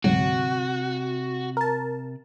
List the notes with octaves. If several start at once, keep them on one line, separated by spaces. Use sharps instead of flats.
D2 G#2 C3 F#3 F#4
A#4 A5